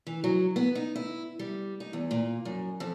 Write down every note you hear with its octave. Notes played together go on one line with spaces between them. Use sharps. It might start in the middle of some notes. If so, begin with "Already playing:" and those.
E3
F#3
B3
D#4
E4
G3
D#4
E2
A#2
F#2
F2